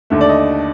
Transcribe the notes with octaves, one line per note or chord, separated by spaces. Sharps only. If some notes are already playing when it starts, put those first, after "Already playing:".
D#2 D3 A3
D5
D#5